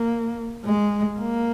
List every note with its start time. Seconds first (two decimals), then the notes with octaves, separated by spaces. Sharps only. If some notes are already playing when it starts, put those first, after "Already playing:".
Already playing: A#3
0.65 G#3
1.19 A#3